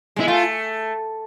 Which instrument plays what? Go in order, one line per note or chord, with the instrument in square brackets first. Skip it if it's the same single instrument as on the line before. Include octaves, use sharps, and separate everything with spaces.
[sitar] G#3 [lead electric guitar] E4
[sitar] A3 [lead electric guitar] F4